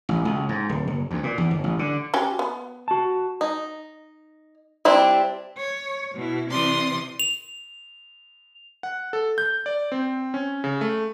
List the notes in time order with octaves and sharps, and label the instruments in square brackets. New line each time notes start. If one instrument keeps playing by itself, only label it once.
[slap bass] A1
C#2
G#2
D1
F#1
D2
A#2
E2
G1
A1
D3
[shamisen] C#4 F#4 G4
B3
[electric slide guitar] F#4 A5
[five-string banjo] D#4
G3 C4 D4 E4
[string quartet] C#5
B2 E4
C3 E3 C4 D5 C6 D#6
[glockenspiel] F7
[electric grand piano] F#5
A4
G6
D5
C4
C#4
C#3
A3